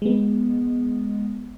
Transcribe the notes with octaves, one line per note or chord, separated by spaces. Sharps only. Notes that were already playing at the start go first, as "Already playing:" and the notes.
G#3 B3